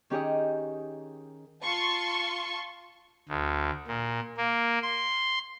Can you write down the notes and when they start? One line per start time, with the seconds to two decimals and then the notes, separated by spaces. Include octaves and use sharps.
0.10 D#3 C#4 G4 G#4 C#5 D#5
1.64 F4 A5 C6 C#6
3.28 D2
3.87 A#2
4.37 A#3
4.83 C6